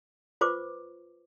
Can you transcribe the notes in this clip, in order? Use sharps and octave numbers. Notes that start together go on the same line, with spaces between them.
F4 B4 C5 C#6 D6